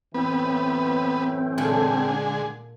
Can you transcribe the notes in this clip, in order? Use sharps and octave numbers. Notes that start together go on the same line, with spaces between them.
F#2 A2 E3 B3 C4 B4
A#2 D3 G#3 A4 G#5